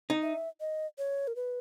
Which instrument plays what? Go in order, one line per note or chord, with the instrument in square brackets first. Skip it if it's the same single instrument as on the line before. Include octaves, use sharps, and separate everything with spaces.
[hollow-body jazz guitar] D#4
[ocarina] E5
D#5
C#5
A#4
B4